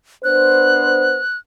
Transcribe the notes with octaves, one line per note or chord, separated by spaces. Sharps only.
B3 D4 C5 F#6